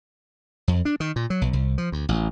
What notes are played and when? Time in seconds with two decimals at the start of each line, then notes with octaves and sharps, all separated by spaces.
0.68 F2
0.85 D4
1.00 D#3
1.16 A#2
1.30 F#3
1.41 B1
1.53 C2
1.78 F3
1.92 D2
2.09 A1